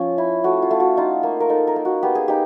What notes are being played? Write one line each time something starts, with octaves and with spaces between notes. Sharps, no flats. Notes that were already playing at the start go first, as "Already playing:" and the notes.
Already playing: F3 C#4
E4
A3 F#4
F4
A3
F#4
D#4 F4
A#3
A#4
D#4 A4
A#4
A#3
F#4
B3 G4
G#4
D#4 G4